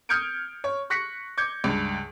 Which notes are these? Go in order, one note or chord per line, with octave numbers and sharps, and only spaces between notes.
D#6 F6 G6 G#6 C#7 D7
C#5
C#6 F#6 A#6 B6 C#7
D6 G6 G#6 C#7
C#2 G2